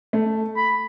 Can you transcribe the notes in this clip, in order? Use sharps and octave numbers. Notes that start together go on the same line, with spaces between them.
A3
B5